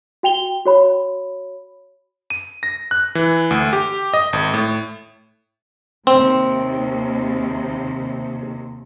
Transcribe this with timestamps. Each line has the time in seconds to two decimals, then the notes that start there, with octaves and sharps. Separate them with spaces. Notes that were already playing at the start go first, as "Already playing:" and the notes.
0.23 F#4 G5 F7 G7
0.65 F#4 C#5 B5
2.30 D#7
2.63 A#6
2.91 F#6
3.15 E3
3.51 D2
3.73 G4
4.14 D#5
4.33 G#1
4.54 A2
6.07 D#2 C3 C4